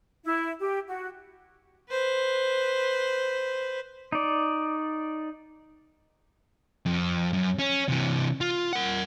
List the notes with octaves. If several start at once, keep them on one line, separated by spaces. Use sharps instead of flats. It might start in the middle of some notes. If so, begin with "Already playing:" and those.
E4
G4
F#4
B4 C5
D#4 D5
F2
F#2
C#4
C3 E3
F4
A#4 F#5